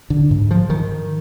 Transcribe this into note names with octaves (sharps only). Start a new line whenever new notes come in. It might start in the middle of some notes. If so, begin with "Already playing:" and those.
D3
G#2
F3
D#3